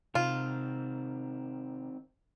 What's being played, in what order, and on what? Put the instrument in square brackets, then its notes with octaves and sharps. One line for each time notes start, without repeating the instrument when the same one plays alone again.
[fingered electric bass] C3 [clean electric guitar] D#3 C4 [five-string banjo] F4